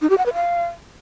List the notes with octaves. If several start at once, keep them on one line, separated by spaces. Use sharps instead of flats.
D#4
G4
F#5
B4
F5